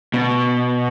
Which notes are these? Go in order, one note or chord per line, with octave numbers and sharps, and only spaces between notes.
B2